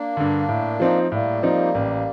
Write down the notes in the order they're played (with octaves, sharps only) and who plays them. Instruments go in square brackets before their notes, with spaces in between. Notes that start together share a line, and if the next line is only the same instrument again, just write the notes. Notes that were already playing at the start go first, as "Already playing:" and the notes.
Already playing: [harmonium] A#3 D4
[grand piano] G2 D3
A2
F3 C4 D#4
[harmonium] A3
[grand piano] A2 [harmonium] G3 A#3
[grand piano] F3 C4 D#4
A1